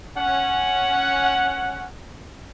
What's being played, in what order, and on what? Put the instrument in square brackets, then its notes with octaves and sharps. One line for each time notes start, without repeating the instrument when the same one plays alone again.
[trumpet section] C#4 F#5